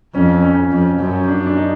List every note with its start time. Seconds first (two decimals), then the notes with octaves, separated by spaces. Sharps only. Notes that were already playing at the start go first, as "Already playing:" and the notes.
0.14 F2 C#4
0.42 C#4
0.71 F2
1.00 F#2
1.28 D4
1.46 D4
1.56 D#4